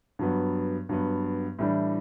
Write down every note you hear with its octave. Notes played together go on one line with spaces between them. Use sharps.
G2 F#3 B3
G2 F#3 B3
A2 E3 G3 D4